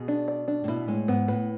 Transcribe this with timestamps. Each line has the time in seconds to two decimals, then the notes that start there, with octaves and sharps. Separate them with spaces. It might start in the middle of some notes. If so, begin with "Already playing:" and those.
Already playing: B2 G#4
0.08 D4
0.28 D5
0.48 D4
0.64 A2
0.68 B2 E4
0.88 A2 G#3
1.08 G#2 B3
1.28 A2 B4